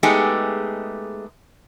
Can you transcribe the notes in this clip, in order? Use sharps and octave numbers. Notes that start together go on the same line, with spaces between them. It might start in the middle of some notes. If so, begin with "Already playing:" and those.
G#3 A3 B3 D#4 G4 G#4